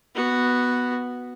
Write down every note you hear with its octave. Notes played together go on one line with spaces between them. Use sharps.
B3 F#4